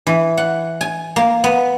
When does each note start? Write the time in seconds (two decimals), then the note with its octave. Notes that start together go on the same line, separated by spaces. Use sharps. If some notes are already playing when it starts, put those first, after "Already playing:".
0.07 E3
0.37 F#5
0.81 G#5
1.16 A#3
1.44 B3